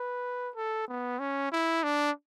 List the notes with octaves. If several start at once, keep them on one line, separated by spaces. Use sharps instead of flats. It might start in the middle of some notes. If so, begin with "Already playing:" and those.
Already playing: B4
A4
B3
C#4
E4
D4